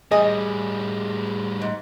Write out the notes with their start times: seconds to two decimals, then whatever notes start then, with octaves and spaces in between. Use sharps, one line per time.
0.11 A2 G3 G#4 D#5 G#5
1.61 G#2